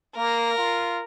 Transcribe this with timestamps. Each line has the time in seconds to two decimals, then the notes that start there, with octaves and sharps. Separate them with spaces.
0.16 A#3 A#4
0.58 F4